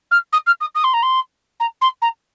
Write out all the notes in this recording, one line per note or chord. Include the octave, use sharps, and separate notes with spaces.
F6
D#6
F6
D#6
D#6
C6
A#5
C6
A#5
C6
A#5